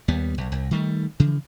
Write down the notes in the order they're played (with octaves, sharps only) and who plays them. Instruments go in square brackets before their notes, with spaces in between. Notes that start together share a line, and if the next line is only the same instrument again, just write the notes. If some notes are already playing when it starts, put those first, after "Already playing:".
[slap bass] D#2 G3 B3
B1
C2
D#3 G3 A3
C#3 E3 F3